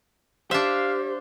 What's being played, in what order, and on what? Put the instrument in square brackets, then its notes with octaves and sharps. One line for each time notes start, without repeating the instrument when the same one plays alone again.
[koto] D4 E5 [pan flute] G4 [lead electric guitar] C5 [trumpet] F5